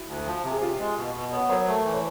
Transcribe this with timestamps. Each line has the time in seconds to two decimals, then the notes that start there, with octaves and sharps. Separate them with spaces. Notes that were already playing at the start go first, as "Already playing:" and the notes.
Already playing: E4 F#4
0.08 D2
0.26 F3
0.43 C3
0.51 G#4
0.62 C3 F4 G4
0.79 G#3
0.97 B2
1.15 B2
1.32 B3 B4 C#5
1.49 F#3 A#4 C5
1.67 A3
1.85 E3
1.94 C5